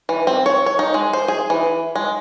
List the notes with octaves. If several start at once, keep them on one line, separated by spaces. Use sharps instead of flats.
E3
C4
C#5
C#5
D#4
G#3
C5
G#4
E3
G#3